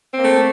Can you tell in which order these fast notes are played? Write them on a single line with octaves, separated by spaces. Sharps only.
C4 A#3 A3